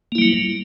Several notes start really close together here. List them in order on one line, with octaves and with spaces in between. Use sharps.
A#3 E4 G3 F#3